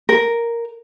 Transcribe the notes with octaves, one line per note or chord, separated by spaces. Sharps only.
A#4